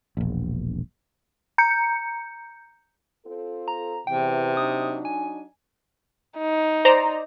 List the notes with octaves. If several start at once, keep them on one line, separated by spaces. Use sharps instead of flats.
E1 A#1
A#5 G6 C#7
C4 F4 A4
A#5
E2 C3 E3 G5
F#3 D4 D#4 D#6
G#5
D#4
C5 D5 A#5